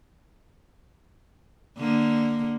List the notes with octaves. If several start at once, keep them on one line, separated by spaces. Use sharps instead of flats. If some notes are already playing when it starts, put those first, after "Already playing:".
D3 A#3